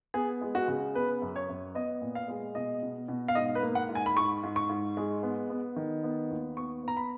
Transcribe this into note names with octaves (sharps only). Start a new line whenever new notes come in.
B3 G#4
G#3
F#4
C#3
B3 B4
F#2
C#5
F#2
B3 D#5
A#2
F5
G#3
B2 D#5
B2
B2
F5
G#2 D#5
B4
A#3
F#5
G#2
G#5
B5
G#2 C#6
G#2
C#6
G#2
G#3
B3
B3
D#3
B3
D#2
B3 C#6
B3 A#5
B5